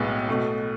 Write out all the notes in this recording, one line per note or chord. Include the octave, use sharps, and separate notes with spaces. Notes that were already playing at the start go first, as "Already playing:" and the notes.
Already playing: B1 A2 G#3 B3 G#4
B2 A3